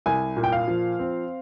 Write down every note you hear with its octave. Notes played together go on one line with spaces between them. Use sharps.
C2 G#5
A#2
G5
F5
F3
C4